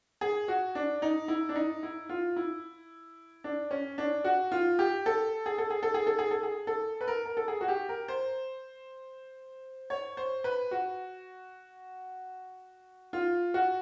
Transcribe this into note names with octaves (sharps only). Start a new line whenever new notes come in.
G#4
F#4
D4
D#4
E4
D4
D#4
E4
F4
E4
D4
C#4
D4
F#4
F4
G4
A4
G#4
A4
G#4
A4
G#4
A4
G#4
A4
G#4
A4
B4
A#4
A#4
A4
G#4
F#4
G4
A#4
C5
C#5
C5
B4
F#4
F4
F#4